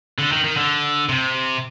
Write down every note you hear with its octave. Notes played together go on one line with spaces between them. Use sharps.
D3
D#3
D#3
D3
C3